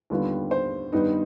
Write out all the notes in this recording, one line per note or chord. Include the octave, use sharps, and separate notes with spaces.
D#2 D3 G3 B3 F4
C5
G2 D#3 G3 B3 D#4